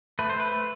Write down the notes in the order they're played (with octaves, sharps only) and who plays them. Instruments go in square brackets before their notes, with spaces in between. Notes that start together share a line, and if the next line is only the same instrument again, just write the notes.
[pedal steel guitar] A3 B4
A3 C5
B4
A3